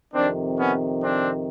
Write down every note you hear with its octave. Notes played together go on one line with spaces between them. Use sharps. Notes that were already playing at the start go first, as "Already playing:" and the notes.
F2 C3 D#3 C4 D4
B3 C#4
C4 D4